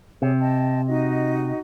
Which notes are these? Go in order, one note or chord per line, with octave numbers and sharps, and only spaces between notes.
C3 G#4 C#5
D#5 G5 A5
D#4 F#4 D#5